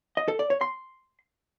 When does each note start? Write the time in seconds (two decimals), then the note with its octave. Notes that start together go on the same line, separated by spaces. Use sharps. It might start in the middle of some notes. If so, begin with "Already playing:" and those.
0.17 D#5
0.28 A4
0.39 D5
0.50 C#5
0.61 C6